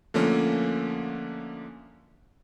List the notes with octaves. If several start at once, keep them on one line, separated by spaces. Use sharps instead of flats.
D3 F3 A3 A#3 C#4